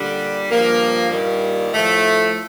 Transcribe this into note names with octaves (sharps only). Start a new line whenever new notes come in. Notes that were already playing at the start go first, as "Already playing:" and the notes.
Already playing: A#2 D3 G3 D4
G2 A#2 F3 A#3
G2 A#2 D#3 G3 A#3
A2 F3 A3